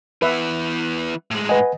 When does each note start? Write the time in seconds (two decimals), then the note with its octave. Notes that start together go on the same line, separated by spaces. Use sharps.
0.22 E3 B3 B4 E5
1.31 A2 G#3
1.49 B4 D#5 F#5 G#5